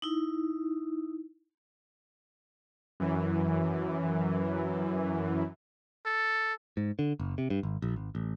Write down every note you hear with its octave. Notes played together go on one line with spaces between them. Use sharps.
D#4 E4
F#2 E3
A4
G#2
D3
F#1
C3
G2
G#1
A#1
G#1
A1